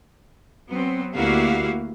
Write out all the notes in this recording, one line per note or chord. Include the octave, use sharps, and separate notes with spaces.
F#3 B3 C4
D2 A#3 E4 F#4 G4 F5